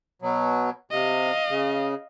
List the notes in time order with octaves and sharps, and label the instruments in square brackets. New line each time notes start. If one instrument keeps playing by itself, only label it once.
[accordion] B2 F#3
[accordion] C3 [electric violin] D#5 F5
[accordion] C#3